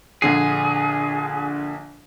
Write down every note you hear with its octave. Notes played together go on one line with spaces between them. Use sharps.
A#1 D3 G#4 C7